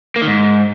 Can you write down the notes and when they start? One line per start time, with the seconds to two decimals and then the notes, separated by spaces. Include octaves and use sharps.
0.16 A#3
0.22 D#3
0.28 G#2